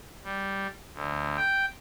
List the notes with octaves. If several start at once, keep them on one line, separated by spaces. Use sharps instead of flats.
G3
D2
G5